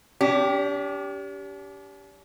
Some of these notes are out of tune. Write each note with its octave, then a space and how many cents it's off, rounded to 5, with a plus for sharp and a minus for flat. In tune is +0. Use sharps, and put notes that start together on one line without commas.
D4 -45 G4 +0